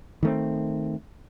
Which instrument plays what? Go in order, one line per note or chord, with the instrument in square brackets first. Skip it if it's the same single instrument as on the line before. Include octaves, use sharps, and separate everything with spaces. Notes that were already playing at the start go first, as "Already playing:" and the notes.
[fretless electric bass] D#3 A3 C4